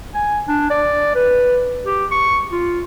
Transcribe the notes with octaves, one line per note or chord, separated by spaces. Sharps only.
G#5
D4
D5
B4
G4
C#6
F4